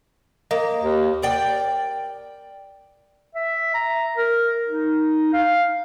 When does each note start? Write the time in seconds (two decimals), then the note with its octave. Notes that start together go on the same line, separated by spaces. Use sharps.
0.51 A#3 D#5
0.84 D#2
1.22 A#4 D5 G5
3.35 E5
3.74 A#5
4.17 A#4
4.68 D#4
5.33 F5